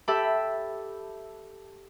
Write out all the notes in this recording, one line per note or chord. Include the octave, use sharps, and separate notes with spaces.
G4 A4 E5 G5 B5 E6